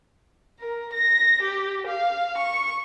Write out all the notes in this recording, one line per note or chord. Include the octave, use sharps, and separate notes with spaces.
A#4
A#6
G4
F5
C#6